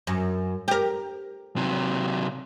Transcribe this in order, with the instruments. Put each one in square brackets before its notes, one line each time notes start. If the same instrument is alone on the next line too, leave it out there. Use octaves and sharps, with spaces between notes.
[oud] F#2
G4 A#4
[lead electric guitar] C3 F#3